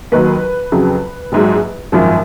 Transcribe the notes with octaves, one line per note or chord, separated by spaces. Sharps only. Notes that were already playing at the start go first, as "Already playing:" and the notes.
D#2 D#3 F#3 B4
F2 C#3 F#3
A#1 G#2 F#3
G#1 F#2 F3